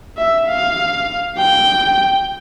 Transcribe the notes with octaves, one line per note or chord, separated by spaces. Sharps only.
E5
F5
G5